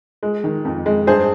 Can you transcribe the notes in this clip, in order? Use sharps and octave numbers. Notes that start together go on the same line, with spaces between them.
G#3
D#3
F2
G#3
G2 G#4 C5